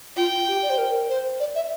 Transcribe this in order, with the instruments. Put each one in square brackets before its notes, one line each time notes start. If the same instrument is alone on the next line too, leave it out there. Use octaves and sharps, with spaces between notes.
[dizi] F4 [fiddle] G5
[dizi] G4
D5
C5
A#4
C5
D5
E5